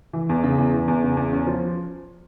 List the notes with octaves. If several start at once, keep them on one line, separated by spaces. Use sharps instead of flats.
E3
E2
C#3
E2
E3
E2
C#3
E2
C#4
F3